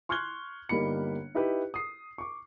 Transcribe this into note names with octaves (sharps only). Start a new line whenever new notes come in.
C6 C#6 F6 F#6 G#6 G7
G1 G3 A#3 D#4 B5 C#7
D#4 E4 G4 B4
D#6 C7
C#6 D6